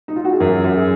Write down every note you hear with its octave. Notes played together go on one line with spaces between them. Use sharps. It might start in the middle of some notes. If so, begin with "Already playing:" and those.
D#4
F4
F#4
G#4
F#2 A#4
F#2
G#4